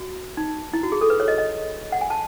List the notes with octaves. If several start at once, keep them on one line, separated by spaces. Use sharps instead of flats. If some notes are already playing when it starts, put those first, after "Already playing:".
Already playing: F#4
D#4
E4
F#4
G#4
A4
B4
C#5
D#5
D#5
F#5
G#5
A5